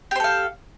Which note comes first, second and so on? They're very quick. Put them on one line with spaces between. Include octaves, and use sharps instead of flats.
G4 C5 A4 F5